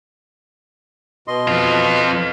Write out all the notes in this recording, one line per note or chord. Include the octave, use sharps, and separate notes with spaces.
B2 D#5 C6
F2 F4